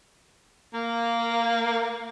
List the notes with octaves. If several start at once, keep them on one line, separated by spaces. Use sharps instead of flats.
A#3